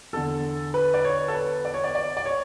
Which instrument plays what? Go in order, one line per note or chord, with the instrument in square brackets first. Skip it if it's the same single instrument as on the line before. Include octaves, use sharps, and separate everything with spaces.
[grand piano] E2 D3 A4
B4
D5
C#5
A4
B4
D5
C#5
D5
D5
D5
C#5